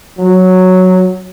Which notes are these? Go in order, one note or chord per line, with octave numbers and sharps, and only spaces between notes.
F#3